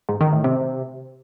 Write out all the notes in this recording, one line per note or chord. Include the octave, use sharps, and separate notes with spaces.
G#2
D#3
A2
C3